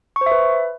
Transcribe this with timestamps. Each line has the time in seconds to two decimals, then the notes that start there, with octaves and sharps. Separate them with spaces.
0.16 C#6
0.21 C5
0.26 E5
0.32 B4